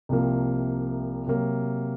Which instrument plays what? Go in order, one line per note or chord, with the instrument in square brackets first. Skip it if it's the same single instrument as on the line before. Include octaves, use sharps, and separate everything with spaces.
[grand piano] C2 C3 F3 A#3
C3 F#3 A#3